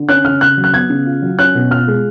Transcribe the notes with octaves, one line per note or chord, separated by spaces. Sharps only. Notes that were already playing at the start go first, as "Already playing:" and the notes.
Already playing: D3
C#4 F#6
C#3 F6
C#3 F#6
F#3
F#6
B3 G#6
C#3
F4
F#3
C#4 F#6
B2
F4 F6
G#3